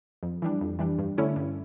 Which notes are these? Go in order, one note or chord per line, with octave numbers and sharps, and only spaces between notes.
F2
E3 G3 D4
F2
E3 G3 D4
G2
D3 A3 C#4 E4
G2